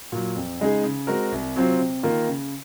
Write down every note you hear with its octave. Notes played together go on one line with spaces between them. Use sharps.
A#2 F#3
F2
C#3 G#3 D#4 G#4
C#3
G#3 C4 F#4 A#4
C2
C3 F#3 C4 F4
C3
D#3 A#3 F4 A#4
C#3